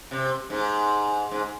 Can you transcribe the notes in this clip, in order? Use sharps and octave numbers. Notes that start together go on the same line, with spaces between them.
C3
G#2
G#2